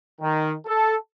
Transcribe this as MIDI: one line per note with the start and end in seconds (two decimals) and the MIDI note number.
0.20 0.54 51
0.65 0.94 69